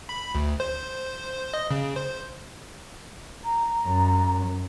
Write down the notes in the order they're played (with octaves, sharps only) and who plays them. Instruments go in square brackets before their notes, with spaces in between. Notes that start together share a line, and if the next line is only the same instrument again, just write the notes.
[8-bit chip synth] B5
D2
C5
D#5
C#3
C5
[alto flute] A#5
[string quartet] F#2